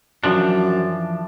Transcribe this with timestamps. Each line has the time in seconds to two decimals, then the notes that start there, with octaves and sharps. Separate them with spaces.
0.24 F#2 E3 F3 D4